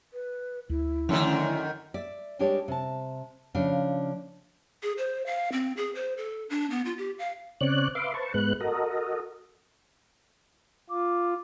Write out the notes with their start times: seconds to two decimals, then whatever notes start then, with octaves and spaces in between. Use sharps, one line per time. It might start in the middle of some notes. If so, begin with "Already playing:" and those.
0.14 B4
0.69 D2 E4
1.09 F#2 D3 D#3 F3 A3 C#4
1.94 D5 E5
2.39 G3 G#3 D4 G4 B4 C#5
2.68 C3 A5
3.55 C#3 F3 A3 D4 F5
4.83 G#4
4.98 C5
5.26 F5
5.52 C4
5.77 G#4
5.95 C5
6.18 A4
6.50 D4
6.70 B3
6.86 F4
6.98 G4
7.19 F5
7.61 C#3 C4 C#5 D5 F#6
7.95 B4 E5 F5 C6 D6
8.14 B4 C5 A5 C#6
8.34 G#2 G#3 B3 B4 F#6
8.61 F#4 A4 A#4 D#5
10.90 F4 D6